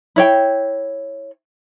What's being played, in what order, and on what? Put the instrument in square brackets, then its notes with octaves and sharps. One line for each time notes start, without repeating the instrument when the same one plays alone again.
[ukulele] E4 C#5 G5